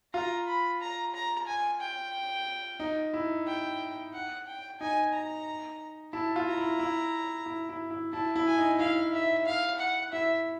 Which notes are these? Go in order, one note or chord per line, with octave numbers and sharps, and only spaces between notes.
F4 A#5
B5
A#5
A#5
G#5
G5
D#4
E4
G5
F#5
G5
D#4 G#5
A#5
E4 A5
F4
A#5
E4
E4
E4
E4
E4
E4 A5
E4
G#5
D#4
E4 F5
E5
F5
F#5
E4 E5